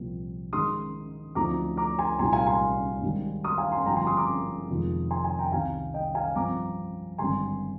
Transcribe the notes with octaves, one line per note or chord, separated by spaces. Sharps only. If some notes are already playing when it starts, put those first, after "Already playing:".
Already playing: C2 A#2 F3 C4
G#2 D#3 G#3 D#4 C6 D#6
D2 D3 F3 C4 D#4 A#5 D6
A#5 D6
G#5 C6
C2 A#2 G3 A#3 D#4 G#5 C6
F5 G#5
G#5 C6
G#2 D#3 G3
C6 D#6
F5 G#5
G#5 C6
G#1 G2 D3 F3 C4 G5 A#5
G#5 C6
C6 D#6
A#5 D6
F1 F2 D#3 G#3
G#5 C6
G#5 C6
G5 A#5
C2 C3 D#3 G3 F5 G#5
D#5 G5
F5 G#5
G2 F3 C4 A#5 D6
G#1 G2 D3 G#5 C6